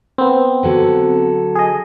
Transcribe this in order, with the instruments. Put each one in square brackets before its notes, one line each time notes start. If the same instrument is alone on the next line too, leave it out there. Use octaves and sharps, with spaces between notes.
[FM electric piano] B3 C4
[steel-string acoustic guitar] D3 F#3 A4
[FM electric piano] G#4 D#5